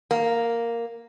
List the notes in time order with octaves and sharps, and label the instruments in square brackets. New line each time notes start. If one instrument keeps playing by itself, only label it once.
[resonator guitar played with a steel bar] A#3